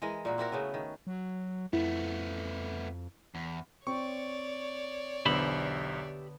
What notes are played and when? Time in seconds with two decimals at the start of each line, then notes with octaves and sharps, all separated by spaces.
0.02 E3 G#3 A#4 D#5
0.25 A#2 A#3 F#4
0.38 C4 E4 F#4 A#4
0.52 C#3 A3 B3 C#4
0.74 D#3
1.07 F#3
1.73 F2 A3 B3 E4
3.35 E2
3.87 C4 C#5 D5 C#6
5.26 B1 E2 D3 B3 G4 C5 E5 B5